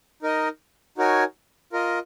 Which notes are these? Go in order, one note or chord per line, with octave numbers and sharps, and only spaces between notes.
D#4 A#4 D#5
D#4 F#4 A#4 C#5 G#5
F4 A#4 D#5